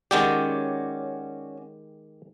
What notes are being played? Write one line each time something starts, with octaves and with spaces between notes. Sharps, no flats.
D#3 G#3 C#4 F#4 G4 D5